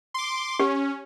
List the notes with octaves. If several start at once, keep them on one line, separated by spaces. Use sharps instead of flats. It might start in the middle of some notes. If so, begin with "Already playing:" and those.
C6 D6
C#4 G4